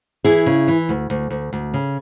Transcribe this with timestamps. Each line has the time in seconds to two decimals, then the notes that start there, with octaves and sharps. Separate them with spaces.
0.24 E3 E4 G#4
0.46 C#3
0.68 E3
0.89 D2
1.10 D2
1.30 D2
1.53 D2
1.74 C#3